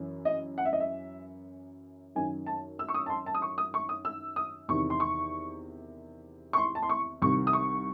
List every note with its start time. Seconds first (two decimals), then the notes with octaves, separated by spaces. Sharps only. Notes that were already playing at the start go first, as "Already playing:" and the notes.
Already playing: F#2 E3
0.25 D#5
0.58 F#5
0.65 E5
0.73 D#5
0.80 E5
2.15 F#2 D#3 G#5
2.46 A5
2.79 E6
2.89 C#6
2.94 D#6
3.06 A5
3.10 C6
3.26 A5
3.35 D#6
3.42 C#6
3.58 D#6
3.74 C#6
3.89 D#6
4.05 E6
4.36 D#6
4.68 E2 C3 D#3 C#6
4.90 C6
5.00 C#6
6.53 C#6
6.58 C6
6.75 A5
6.83 C6
6.89 C#6
7.22 C2 C3 D#3 C#6
7.47 D#6
7.53 C#6